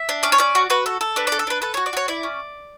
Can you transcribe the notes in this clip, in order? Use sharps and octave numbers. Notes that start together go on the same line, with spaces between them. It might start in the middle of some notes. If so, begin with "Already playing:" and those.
Already playing: E5
D4
C#4 D5
C#5
C#4 D5
F#4
F#4 B4
A4
A4
D4 B4
A4 D5
A4
D4 B4
A4 B4
F#4 C#5
D5
F#4 C#5
E4 D5
C#4